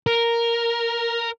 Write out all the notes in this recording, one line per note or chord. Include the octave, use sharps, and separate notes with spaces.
A#4